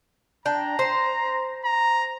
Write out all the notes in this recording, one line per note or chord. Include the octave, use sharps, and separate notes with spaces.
D4 G5 A#5
C5
A#5